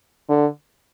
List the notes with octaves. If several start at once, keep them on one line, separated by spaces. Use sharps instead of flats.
D3